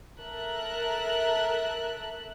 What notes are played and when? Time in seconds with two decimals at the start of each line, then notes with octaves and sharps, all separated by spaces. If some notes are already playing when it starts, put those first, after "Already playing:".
0.20 A4 A#4 E5 F#6